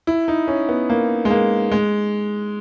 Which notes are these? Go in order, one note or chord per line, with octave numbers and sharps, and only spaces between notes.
E4
D#4
C#4
B3
A#3
G#3
A#3
G#3